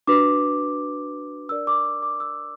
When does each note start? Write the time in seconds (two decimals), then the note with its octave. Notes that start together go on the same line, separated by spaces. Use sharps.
0.07 D4 F#4 B4 D6
1.49 D4 A#4 D5 E6
1.67 D6
1.85 D6
2.02 D6
2.20 E6